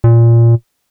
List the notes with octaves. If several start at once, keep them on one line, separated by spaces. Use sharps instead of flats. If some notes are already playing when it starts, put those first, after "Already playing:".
A#2